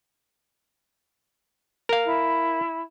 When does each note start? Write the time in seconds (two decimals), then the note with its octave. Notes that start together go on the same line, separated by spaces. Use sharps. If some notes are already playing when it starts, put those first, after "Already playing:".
1.89 A#4 F5
2.05 E4